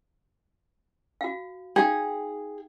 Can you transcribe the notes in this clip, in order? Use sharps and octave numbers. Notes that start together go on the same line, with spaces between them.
F#4 F5
D#4 G#4 F5 G5